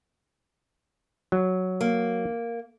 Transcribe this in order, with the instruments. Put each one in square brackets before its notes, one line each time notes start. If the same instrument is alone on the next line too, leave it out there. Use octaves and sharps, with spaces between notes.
[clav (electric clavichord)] F#3
[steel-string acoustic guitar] A#3